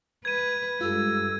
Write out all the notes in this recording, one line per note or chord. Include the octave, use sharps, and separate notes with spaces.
B4 G#6 D#7
G2 G#3 F4 G4 A4 E6